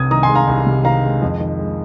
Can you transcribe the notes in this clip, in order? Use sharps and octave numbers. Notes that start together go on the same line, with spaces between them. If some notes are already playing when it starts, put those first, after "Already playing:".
Already playing: C2 C3 D#6 G#6
D#3 A#5 D#6
G#5 C6
G#3
F5 A#5
C2
C3
D#3 F5 A#5
G#3
F2
D#3
G#3